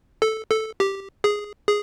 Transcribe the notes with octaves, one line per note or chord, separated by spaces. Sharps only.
A4
A4
G4
G#4
G#4